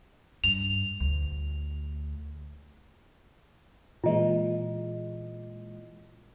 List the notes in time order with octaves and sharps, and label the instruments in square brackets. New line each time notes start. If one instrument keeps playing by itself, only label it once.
[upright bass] G2 [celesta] F7
[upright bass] D2
[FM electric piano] A#2 E3 G#3 [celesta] F4 D#5